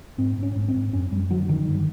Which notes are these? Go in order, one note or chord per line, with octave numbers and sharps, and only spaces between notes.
G#2 C4
G#2
C#4
G#2
C4
G#2
F#2 C#4
F#2 G3
D3 F#3
D3 D#3
G2